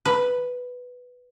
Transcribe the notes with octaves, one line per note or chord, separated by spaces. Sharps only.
B4